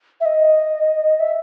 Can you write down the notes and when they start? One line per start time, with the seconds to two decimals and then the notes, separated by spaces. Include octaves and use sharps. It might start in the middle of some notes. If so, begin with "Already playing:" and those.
0.21 E5
0.25 D#5
1.20 E5